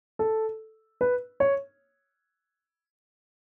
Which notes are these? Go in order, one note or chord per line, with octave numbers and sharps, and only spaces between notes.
A4
B4
C#5